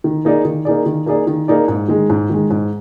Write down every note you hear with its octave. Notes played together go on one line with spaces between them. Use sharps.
D#3
A#3 D#4 G#4 D5
D#3
A#3 D#4 G#4 D5
D#3
A#3 D#4 G#4 D5
D#3
A#3 D#4 G#4 D5
G#2
D#3 G#3
G#2
D#3 G#3
G#2